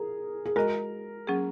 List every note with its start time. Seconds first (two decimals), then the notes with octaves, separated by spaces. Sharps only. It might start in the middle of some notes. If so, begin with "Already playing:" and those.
Already playing: G#4 A#4
0.45 G#4
0.56 G#3 F#4 A#4 D#5
1.27 F#3 A#3 C#4 G#4